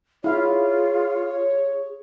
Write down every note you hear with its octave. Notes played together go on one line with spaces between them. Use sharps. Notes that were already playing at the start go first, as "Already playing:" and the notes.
E4 F4 G#4 C#5 F5